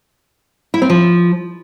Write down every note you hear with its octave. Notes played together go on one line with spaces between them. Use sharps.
E4
C4
F3